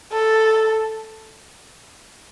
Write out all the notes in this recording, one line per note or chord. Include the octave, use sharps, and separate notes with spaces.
A4